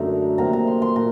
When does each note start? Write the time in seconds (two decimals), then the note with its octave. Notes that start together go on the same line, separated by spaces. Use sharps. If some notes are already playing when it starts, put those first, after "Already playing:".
Already playing: F#2 D3 A3 D#4 A#5
0.38 C3 F#3 A#3 A#5
0.53 A#5
0.67 C6
0.82 C6
0.95 A#2 A#5